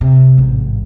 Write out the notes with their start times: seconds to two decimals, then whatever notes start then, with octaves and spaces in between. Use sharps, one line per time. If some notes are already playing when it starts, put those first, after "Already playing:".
0.01 C3
0.38 A1 G#2